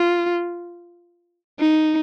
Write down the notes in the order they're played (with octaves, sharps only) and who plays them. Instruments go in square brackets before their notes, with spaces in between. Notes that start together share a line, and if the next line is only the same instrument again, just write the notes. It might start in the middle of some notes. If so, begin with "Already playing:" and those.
Already playing: [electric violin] F4
D#4